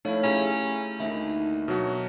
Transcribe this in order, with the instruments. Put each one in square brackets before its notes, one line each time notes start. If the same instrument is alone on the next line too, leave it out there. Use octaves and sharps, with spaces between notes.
[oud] F3 [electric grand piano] A3 E4 [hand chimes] D#4 C#5 F5
[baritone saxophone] C#4 [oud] G4 G#4 E5 [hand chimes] A#5 B5
[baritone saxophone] D2 [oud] D#3 A#3 D#4 [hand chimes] E5 B5
[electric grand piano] B2 F#3 F#4